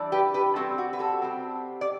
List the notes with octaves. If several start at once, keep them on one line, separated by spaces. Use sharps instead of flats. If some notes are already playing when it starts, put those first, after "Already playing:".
Already playing: E3 G3 D4
G4 B4
G4 B4
C3 G3 C4 F#4 A4
F#4
B4
F#4 A4
C3 G3 C4
D5